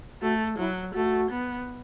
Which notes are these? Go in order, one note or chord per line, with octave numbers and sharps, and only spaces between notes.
A3 F#4
F#3 E4
A3 F#4
B3